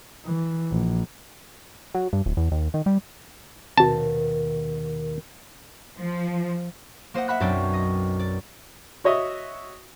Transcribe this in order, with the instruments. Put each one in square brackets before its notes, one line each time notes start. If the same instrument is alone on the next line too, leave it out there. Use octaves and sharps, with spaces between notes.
[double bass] E3
A#1
[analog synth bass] F#3
G2
D1
E2
D#2
D#3
G3
[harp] D#2 B2 D#3 [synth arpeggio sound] C4 F#4 [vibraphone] A#4 [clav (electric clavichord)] A5
[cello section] F3
[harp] A#3 C5 D#5 F#5
E5 F#5 B5 F#6
B1 F#2 C4 D4 D5 G5
D#5
D5
[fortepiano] F#4 C#5 D#5 E5